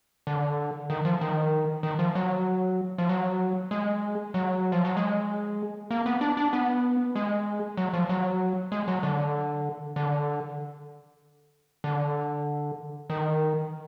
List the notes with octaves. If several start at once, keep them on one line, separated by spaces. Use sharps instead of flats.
D3
D#3
F3
D#3
D#3
F3
F#3
F3
F#3
G#3
F#3
F3
F#3
G#3
A#3
B3
D4
D4
B3
G#3
F#3
F3
F#3
G#3
F#3
D3
D3
D3
D#3